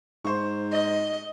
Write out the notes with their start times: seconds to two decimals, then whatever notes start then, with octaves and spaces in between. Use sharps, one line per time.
0.25 G#2 C5 C#6
0.72 D#5